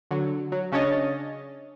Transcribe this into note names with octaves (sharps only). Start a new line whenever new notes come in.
D3 F#3
F#3
C#3 C#4 D4 C#5 D#5 A6